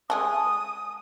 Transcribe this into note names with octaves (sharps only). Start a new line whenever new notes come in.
G#3 G#4 A4 D#6